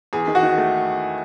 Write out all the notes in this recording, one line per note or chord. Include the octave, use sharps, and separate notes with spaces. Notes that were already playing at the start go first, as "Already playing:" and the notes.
E2 G#4
D#3
F#4
D#3
A3